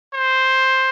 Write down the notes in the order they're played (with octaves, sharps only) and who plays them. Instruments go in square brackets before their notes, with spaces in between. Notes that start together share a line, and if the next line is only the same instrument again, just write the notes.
[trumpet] C5